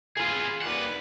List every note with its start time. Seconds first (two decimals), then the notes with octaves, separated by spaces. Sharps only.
0.17 F4 G#4 B4
0.62 D#2 B4 D5 F#5